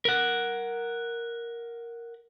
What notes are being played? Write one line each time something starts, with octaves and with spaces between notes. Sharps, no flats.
A#4 F#5